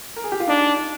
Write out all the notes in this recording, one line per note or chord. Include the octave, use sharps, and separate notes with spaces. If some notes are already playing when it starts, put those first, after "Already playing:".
A#4
G#4
G4
F4
D4 D#4